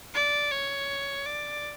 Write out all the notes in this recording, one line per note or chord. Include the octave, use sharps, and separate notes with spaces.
D5
C#5
D5